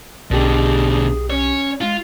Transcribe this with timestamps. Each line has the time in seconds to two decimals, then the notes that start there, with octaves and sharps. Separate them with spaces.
0.31 B1 B2 D3 G4 G#4
1.30 C#4 C#5
1.81 G#3 F4